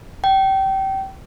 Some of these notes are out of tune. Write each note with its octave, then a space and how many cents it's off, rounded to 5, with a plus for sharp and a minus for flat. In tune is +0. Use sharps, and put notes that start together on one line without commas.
G5 -25